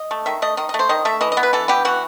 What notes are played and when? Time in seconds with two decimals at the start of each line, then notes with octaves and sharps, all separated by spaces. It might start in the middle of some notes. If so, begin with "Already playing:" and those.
Already playing: D#5
0.11 A3
0.26 D#3 E5
0.42 A3 D#5
0.57 D#3 D#5
0.69 D#5
0.74 A3
0.79 C5
0.89 D#3 D#5
1.05 A3 E5
1.21 E3 D#5
1.32 D#5
1.37 B3
1.43 B4
1.53 E3 A4
1.68 B3 G4
1.85 E3 F#4